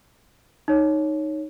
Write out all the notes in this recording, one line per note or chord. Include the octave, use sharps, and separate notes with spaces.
D#4 C#5